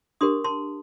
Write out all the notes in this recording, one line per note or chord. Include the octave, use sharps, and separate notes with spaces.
D4 G4 A#4 C6 D#6
A5 C6